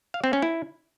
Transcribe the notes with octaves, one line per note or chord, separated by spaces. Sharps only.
F5
C4
C#4
E4